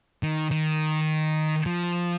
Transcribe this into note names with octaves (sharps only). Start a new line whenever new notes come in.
D#3
D#3
F3